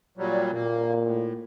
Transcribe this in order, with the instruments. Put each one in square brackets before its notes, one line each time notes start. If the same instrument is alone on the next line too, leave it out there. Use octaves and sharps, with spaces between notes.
[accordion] A#2 F#3 G3
[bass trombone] A#2 [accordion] A#3
[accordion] A2